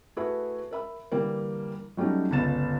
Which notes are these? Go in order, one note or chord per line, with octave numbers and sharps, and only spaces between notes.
A3 E4 F#4 G#4 B4 E5
A#4 E5 B5
D3 E3 G3 A#3
F#3 G3 A3 C#4 D#4
G1 C#2 A6 E7